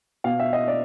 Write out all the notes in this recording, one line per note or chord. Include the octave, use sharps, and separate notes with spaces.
B2 F5
E5
D#5
D5